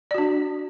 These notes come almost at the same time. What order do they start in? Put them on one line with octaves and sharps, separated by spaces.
D5 F#4 D4